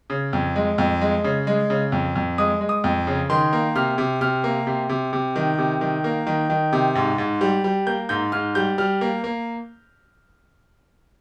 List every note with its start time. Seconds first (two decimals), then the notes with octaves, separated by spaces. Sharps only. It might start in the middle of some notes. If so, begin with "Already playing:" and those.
0.10 C#3
0.33 F2
0.56 G#3
0.78 F2
1.01 G#3
1.24 C#3
1.47 G#3
1.70 C#3
1.92 F2
2.15 F2
2.38 G#3 D#6
2.61 G#3
2.69 D#6
2.84 F2
3.07 C#3
3.30 D#3 C6
3.53 A#3
3.76 C3 F6
3.98 C3
4.21 C3 F6
4.44 A#3
4.67 C3
4.89 C3
5.13 C3
5.36 D#3
5.58 C3
5.81 D#3
6.04 A#3
6.27 D#3
6.50 D#3
6.73 C3
6.95 G#2
7.18 G#2
7.41 G3
7.64 G3
7.87 A#3 G6
8.09 G#2 G6
8.32 G#2 F6
8.55 G3 G6
8.78 G3 F6
9.01 A#3
9.24 A#3